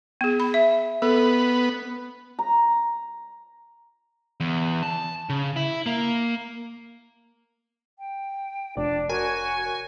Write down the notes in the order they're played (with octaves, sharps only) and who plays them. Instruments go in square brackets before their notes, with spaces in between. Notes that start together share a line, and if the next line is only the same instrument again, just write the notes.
[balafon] B3 G#4
B5
E5
[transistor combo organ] B3 [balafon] A4
[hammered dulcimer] A#5
[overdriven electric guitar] E2
A5
C#3
E4
A#3
[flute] G5
[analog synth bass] F1 [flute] D4 [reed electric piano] D5
[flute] F#4 [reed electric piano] A#4 C#5 [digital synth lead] G#5